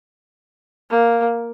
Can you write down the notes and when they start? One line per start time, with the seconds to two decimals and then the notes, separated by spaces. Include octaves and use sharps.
0.90 A#3